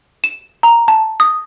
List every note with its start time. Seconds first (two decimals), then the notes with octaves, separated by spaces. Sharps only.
0.24 E7
0.63 A#5
0.88 A5
1.20 D#6